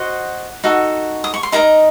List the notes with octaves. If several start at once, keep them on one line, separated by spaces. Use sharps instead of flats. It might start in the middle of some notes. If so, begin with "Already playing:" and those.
Already playing: F#4 C5 D#5 F#5
D#4 F#4 A4
D#6
C#6
C6
D#4 A#4 D#5 A#5